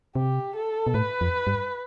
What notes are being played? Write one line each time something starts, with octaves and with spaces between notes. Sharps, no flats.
C3 G4
A4
B2
A2 B4
F2
G2